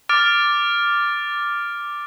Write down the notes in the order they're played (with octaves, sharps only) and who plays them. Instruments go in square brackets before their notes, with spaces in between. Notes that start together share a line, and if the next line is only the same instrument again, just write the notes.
[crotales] D6 F6 A6 D7